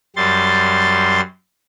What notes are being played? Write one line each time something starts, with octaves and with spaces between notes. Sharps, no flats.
F#2 G3 C6 A6